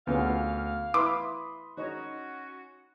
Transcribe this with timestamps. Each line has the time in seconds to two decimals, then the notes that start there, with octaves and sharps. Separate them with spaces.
0.07 D2 B3 C#4 F4 F5
0.94 E4 B4 B5 C6 D6 D#6
1.78 C#4 D#4 F#4 C#5 D#5